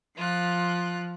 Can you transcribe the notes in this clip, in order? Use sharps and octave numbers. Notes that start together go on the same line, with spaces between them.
F3 F4 F#6